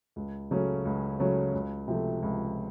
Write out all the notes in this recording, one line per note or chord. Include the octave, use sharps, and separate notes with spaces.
C#2
C#3 F#3 A3 C#4
C#2
C#3 F#3 A3 C#4
C#2
C3 F3 A3
C#2